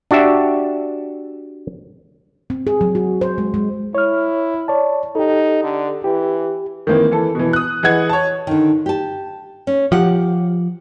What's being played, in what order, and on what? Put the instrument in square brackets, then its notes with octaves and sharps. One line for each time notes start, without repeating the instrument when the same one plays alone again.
[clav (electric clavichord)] D4 F#4 G4 E5
[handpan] C4
G#4
F#3
F#4
C5
G#3
G#3
[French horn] E4 [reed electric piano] C#5 F6
[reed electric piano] C#5 D5 A5
[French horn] D#4 [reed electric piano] G4 A4
[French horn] D3
[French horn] E3 [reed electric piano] G4
[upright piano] D#3 E3 A#3 C4
E3 A4
B2 E3
D#6 F#6
E3 G#4 D#5 F#5 G#6
C#5 A5
[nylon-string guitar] D3 D#3
G4 A5
C#4
[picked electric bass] F3 [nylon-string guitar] G4 F#5